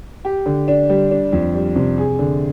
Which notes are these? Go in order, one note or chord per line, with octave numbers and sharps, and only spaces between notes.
G4
D3
D4
G3
D4
F2
G3
C3
G#4
D3